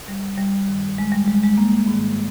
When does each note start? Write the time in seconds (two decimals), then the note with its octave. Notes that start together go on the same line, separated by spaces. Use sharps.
0.08 G3
0.38 G3
0.67 G2 D#3
0.98 G#3
1.12 G3
1.28 G#3
1.43 G#3
1.58 A#3
1.88 G#2 D#3